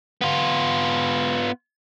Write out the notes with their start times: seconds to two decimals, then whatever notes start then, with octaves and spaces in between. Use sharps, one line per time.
0.21 B3 F4